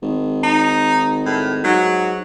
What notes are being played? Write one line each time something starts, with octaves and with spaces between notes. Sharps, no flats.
G#1
D#4
A2
G#2 F#3